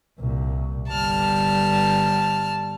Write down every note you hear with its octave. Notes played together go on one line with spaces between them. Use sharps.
C2 A#2
G1 G3 A5 F6